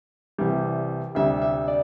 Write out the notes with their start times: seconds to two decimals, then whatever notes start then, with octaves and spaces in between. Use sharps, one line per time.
0.38 C2 C3 E3 G3
1.15 D2 C3 G3 E5
1.42 E5
1.68 D5